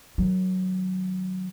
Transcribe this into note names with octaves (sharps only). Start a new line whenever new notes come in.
D#3 F#3